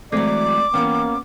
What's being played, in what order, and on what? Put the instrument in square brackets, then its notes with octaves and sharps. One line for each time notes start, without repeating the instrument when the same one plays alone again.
[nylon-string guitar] E3 F#3 [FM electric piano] G#3 A3 C4 [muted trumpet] D5 [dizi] D6
[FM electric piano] E3 G5 [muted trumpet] A#3 [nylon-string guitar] B3 C#4